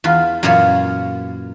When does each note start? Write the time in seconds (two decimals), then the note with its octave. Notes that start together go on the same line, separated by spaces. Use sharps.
0.04 E2 F4 B4
0.43 F#2 A#2 E3 A#3 F4 C#5